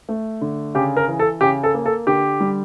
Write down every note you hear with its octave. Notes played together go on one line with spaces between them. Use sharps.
A3
D3
C#3 G4
A#4
E3
A4
C#3 G4
A4
A#3
A4
D3 G4
G3